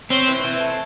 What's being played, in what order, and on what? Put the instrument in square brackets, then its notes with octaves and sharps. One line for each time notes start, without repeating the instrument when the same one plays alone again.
[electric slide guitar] C4 [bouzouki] C#4
[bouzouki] E3
E3
A3